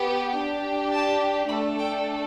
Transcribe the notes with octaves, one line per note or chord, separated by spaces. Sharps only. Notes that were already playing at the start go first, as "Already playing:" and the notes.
Already playing: B3 G4
D4 G4
A5
A3 D4 A4 B5
G5